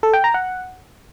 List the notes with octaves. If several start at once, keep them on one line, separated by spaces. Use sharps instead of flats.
A4
G5
A#5
F#5